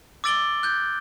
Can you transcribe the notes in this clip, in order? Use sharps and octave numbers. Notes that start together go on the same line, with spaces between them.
D6 E6 A6 D7 F#7 G7
F#6 G6